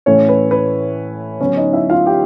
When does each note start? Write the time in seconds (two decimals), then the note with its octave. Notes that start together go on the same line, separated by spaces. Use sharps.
0.06 A2 E3 A3 C#4 E4 C#5
0.29 B4
0.51 B4
1.40 D3 F#3 B3 C#4 C#5
1.57 D#4 D#5
1.73 E4 E5
1.90 F4 F5
2.06 G4 G5